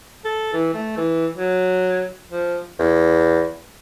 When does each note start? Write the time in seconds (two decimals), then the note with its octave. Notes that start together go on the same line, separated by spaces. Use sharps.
0.25 A4
0.53 E3
0.74 A3
0.97 E3
1.37 F#3
2.30 F3
2.79 E2